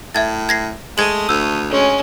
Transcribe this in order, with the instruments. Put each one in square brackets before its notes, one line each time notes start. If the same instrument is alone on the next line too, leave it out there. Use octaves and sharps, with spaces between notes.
[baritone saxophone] A2 [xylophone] E5 G#6 A6
[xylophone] G#6 A#6 C7
[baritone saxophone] G#3 [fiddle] A3 D#6 [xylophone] G#6 F#7
[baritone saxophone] D2 [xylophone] E6
[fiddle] G#3 C#4